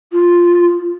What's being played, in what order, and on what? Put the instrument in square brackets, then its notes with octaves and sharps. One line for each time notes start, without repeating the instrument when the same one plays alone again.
[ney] F4